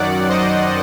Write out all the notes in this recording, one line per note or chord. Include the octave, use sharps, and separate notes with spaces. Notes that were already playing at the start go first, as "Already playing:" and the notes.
Already playing: F#2 D#3 F#3 D5 F#5
C5 D#5